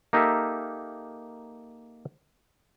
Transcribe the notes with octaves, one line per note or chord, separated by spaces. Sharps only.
A#3 D#4 G4 A4 A#4 E5